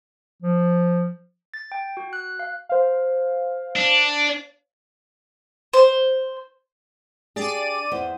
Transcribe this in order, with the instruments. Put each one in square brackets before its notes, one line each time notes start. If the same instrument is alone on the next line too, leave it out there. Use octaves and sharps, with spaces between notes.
[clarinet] F3
[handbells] A6
G5
F#4
F#6
F5
[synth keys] C5 F5
[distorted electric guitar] D4
[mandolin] C5
[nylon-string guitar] D4 G4 G#4 [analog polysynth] D5 D#7
[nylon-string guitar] E2 C5